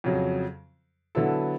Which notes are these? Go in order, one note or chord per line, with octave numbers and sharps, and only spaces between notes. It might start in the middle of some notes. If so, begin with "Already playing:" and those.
F2 C#3 F#3
D3 F#3 B3 E4 A4